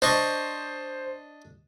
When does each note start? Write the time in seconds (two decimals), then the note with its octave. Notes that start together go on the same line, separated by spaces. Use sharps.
0.02 D4 C5 D#5 C#6